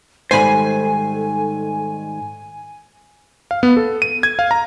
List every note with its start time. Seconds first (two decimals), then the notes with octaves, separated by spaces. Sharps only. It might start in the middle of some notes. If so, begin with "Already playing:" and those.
0.31 G#2 D#3 G3 A4 C5 G#5 B5
3.51 F5
3.63 B3
3.77 A4
4.02 D#7
4.23 G#6
4.39 F5
4.51 A#5